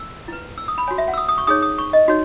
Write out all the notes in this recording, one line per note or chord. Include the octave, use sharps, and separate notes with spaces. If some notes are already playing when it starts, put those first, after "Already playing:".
Already playing: E6
E4 B4
E6
D#6
B5
F#4 C#5 G#5
E5
F#5
E6
D#6
D#6
C#6
D#4 G#4 C#5 D#6
D#6
C#6
D#5
D#4 F#4 C#5